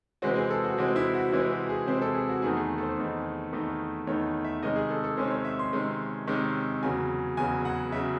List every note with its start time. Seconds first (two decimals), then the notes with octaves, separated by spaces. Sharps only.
0.22 C3 E3 G#3 C4 F#4
0.36 G#4
0.50 A4
0.64 F#4
0.77 C3 E3 G#3 C4 F#4
0.96 E4
1.14 F#4
1.32 C3 E3 G#3 C4 E4
1.51 F#4
1.69 G#4
1.87 C3 E3 G#3 C4 C5
2.02 A4
2.15 G#4
2.29 F#4
2.42 E2 D#3 A3 D#4 G#4
2.57 G#4
2.78 A4
2.83 C5
2.98 E2 D#3 A3 D#4
3.53 E2 D#3 A3 D#4
4.07 E2 D#3 A3 D#4 C#5
4.45 E5
4.63 C3 D#3 G#3 C#4 D#5
4.76 G#4
4.90 A4
5.04 A4
5.17 C3 D#3 G#3 C#4 C5
5.31 C#5
5.45 E5
5.59 C6
5.73 C3 D#3 G#3 C#4
6.27 C3 D#3 G#3 C#4
6.83 E2 C#3 F#3 G#5
7.37 E2 C#3 F#3 G#5
7.65 F#5
7.92 C#3 F#3 E5